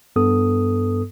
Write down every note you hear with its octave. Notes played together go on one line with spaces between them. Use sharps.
G2 B3 A4 D#6